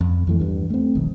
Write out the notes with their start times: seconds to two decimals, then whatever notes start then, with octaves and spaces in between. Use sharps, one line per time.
0.01 F2
0.27 F2 E3 A3
0.40 E2 G2
0.70 A3 C4
0.95 E1 B1 D#3